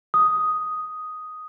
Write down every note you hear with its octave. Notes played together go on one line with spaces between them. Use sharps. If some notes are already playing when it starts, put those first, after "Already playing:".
D#6